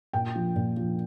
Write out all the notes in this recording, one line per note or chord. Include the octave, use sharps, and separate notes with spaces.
A#2 G5
F3
A#2
F3